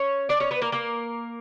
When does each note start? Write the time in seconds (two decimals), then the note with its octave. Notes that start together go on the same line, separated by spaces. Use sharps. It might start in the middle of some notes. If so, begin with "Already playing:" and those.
Already playing: C#4 C#5
0.29 D4 D5
0.40 C#4 C#5
0.51 B3 B4
0.62 A#3 A#4
0.72 A#3 A#4